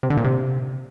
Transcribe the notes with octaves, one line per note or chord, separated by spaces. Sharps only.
C3
D3
A#2
C3